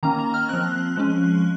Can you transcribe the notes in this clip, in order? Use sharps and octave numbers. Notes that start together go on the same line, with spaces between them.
D#3 A#3 C#4 A#5
A#5
F6
F3 C4 F#6
F3 G#3 C#4